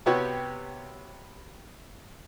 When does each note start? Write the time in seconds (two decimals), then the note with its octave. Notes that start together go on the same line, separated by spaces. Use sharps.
0.06 C3 B3 F#4 G4 C#5